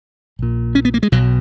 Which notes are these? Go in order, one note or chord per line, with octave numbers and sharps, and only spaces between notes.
A#1 A#2
C#4
B3
A#3
G#3
B1 B2 F#3